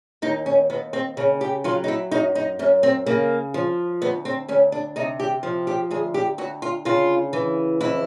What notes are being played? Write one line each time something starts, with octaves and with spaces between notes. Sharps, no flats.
D#2 D#4
C#4
D#2 B3
C4
C#3 C#4
G4
F#3 F4
D#4
E4
F#2 D#4
D#4
F#2 C#4
C4
C#3 A#3
F3
D2 B3
C4
D2 C#4
D4
C3 D#4
G4
F3
G4
D2 G#4
G4
D2 F#4
F4
C#3 F4
E3
F2 E4